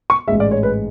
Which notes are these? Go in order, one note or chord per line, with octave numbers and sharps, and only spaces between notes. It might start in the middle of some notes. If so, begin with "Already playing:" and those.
C#6
A1 G#2 G#3 E5
D5
C#5
B4